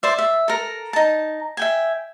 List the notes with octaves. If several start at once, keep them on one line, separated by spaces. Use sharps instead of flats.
C5 D5 E5
E5
A4 A#4 A#5
D#4 A5
E5 G5 G#5